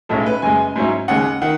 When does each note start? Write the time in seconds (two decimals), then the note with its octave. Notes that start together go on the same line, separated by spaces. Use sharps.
0.09 B1 A2 G#3 C#4 A4
0.26 B4
0.42 F#1 F#2 C#3 G#3 G#5
0.76 G#2 F#3 C#4 E4
1.08 D#2 C#3 G#3 F#5
1.42 D#3 F#5